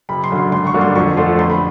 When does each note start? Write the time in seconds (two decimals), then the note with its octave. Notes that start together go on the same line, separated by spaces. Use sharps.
0.09 F#1 B5
0.24 C6
0.31 F#2 D3
0.38 C6
0.52 G#1 C6
0.67 C#6
0.74 G2 D3 F#3 A#3
0.81 C6
0.95 F2 C#6
1.17 D3 F3 A3 C6
1.39 A1 C6
1.50 B5